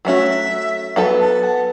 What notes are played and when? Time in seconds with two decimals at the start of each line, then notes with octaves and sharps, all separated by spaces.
0.05 F#3 A3 C#4 F#4 E5
0.96 F#3 B3 A4
1.20 A5
1.43 F#5